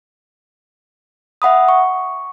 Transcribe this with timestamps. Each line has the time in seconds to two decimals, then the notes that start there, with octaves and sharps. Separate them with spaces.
1.42 E5 F#5 B5 D#6
1.69 C#6